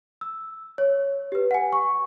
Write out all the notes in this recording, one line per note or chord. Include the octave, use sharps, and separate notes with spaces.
E6
C#5
G4 B4
F#5 G#5
C#6